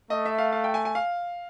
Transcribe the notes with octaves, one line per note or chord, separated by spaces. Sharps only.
A3 D#5
E5
F5
F5
G5
G#5
G#5
F5